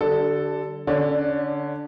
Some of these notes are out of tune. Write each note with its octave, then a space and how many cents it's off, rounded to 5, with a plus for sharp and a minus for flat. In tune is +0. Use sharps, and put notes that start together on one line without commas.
D3 +5 G3 -40 A4 +0
D3 -5 C#4 +15 D5 +20